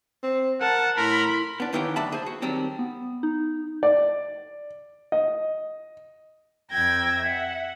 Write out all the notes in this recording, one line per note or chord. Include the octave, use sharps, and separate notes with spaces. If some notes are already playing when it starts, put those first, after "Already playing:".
C4
A#4 F#5 A5
A2 E4 A#4 B5 C6
B3 D4
F2 D#3 E3 B3 G4 C#5
D2 F#3 D4 E5 A5 B5
G#4 C5
F#4
D#3 F#3 G3 C4 D4
B3
D#4
D5
D#5
F2 G5 E6 G#6 A#6
E5 F#5